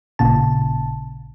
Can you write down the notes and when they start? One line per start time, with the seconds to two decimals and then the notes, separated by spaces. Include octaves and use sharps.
0.19 A1 A#2 C#3 A5